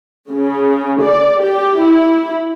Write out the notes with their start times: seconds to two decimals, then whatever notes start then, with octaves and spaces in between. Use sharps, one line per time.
0.32 C#3
1.02 D5
1.43 G4
1.82 E4